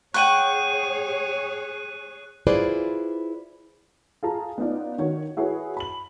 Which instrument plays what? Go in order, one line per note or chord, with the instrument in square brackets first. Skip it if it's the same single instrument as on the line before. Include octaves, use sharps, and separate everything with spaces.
[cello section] G#4 C#5 [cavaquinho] F#5 G5 C#6 [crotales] F#6 D#7
[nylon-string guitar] E4 F4 G#4 B4 C5 D5
[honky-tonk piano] F4 G#4 A5 A#5
B3 C#4 D#4 F4 D5
D#3 F#4 C#5
E4 F#4 G#4 B4 C#5
B5 F#7